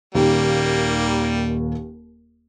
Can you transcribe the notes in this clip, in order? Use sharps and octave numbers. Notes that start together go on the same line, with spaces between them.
D#1 D#2 G3 A#3 G4